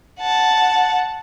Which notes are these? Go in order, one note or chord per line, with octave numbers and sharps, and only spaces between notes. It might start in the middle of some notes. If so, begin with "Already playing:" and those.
F#5 A5